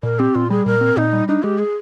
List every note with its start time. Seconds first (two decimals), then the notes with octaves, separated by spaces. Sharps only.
0.03 A#2 A#4
0.19 C4 G4
0.35 A#2 F4
0.50 G3 G#4
0.66 A#2 A#4
0.81 C4
0.97 A#2 D#4
1.13 G3
1.28 D4 D#4
1.43 G#3 G4
1.59 G#4